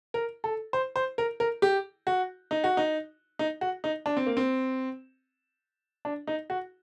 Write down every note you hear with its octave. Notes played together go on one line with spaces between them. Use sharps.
A#4
A4
C5
C5
A#4
A#4
G4
F#4
D#4
F#4
D#4
D#4
F#4
D#4
D4
C4
A#3
C4
D4
D#4
F#4